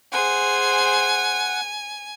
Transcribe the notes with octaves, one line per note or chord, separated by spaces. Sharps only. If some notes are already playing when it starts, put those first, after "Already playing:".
G#4 C5 F#5 G#5